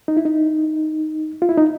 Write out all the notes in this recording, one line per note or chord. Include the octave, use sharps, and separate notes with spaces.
D#4
E4
D#4
F4
E4
D#4